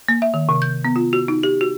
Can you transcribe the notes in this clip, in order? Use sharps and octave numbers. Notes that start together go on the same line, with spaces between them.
A#3
E5
D#3
C3
G6
B3
F4
F#4
D#4
G4
F#4